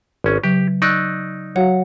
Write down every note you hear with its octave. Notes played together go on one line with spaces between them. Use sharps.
G#1 C#4
C#3 F#3 G4
D#4 D5 C#6 E6 F#6
F#3 F#4 C#5 F5 F#5